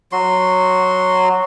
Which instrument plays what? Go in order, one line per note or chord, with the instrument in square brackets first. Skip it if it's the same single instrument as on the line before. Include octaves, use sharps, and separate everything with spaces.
[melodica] F#3 F#4 C6